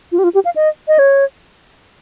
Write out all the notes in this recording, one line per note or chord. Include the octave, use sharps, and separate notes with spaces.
F4
G4
F4
G4
F5
D#5
D#5
C#5